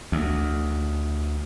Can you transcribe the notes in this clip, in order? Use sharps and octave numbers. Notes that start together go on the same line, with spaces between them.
D2